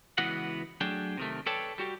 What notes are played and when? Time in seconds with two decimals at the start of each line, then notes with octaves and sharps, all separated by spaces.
0.18 C#2 E3 B3 F#4 D#5 F#5
0.81 F#3 A3 D4 G#4 G5
1.18 C3 D#3 A3
1.46 A4 B4 C#5 D5 G5 A5
1.78 G3 F#4 G4